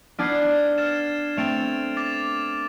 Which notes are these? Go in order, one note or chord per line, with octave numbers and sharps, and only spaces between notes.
B3 D4 F6 G#6 C7
F6 A6 E7
A3 C4 A6 D7 F7
D6 A6 E7